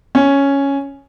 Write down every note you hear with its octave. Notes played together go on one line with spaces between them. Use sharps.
C#4